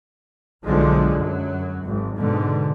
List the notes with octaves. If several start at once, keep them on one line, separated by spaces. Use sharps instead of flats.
B1 D3 F3 F#3 G#3
F#2 F#3
G#1
G#2 B2 D3